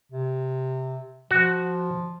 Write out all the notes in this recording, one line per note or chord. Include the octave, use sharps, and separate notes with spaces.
C3
F3 F#4